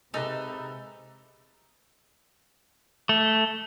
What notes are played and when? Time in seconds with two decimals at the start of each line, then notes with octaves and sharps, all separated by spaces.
0.14 C3 G#3 D#4 G4 A4 B4 E5
3.09 A3